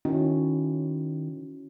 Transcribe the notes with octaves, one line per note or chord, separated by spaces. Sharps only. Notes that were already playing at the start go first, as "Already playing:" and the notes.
D#3 C#4 E4 F#4